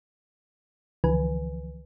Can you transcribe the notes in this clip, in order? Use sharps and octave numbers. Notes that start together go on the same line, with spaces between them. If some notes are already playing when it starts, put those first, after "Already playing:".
C#2 D3 E3 F3 B4 G#5